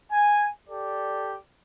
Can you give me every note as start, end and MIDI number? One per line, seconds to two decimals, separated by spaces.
0.11 0.46 80
0.69 1.37 67
0.69 1.37 69
0.69 1.37 74